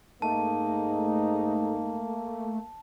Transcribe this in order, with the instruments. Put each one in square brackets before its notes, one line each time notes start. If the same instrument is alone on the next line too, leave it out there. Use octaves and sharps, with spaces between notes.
[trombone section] G#2 D#4 [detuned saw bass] A3 [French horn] A#3 [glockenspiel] A5